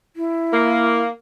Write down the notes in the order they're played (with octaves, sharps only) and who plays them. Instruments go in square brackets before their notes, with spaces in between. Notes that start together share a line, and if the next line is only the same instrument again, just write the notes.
[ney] E4
[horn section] A#3